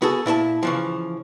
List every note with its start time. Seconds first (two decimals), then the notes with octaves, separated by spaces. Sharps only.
0.02 B3 F#4 G#4 A4
0.26 A#2 E4 C5 A5
0.63 C#3 E3 F3